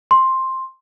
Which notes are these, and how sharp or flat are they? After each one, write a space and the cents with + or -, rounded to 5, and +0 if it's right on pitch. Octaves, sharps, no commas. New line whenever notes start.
C6 +5